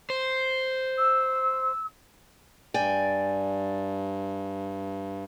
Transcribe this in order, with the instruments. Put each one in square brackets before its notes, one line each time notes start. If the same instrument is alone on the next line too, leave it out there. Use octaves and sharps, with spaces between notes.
[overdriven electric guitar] C5
[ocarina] E6
[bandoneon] G2 [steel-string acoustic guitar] D5 G5 G#5